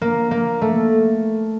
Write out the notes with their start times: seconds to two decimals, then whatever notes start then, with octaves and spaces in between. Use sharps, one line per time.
0.01 A#3
0.31 A#3
0.61 A3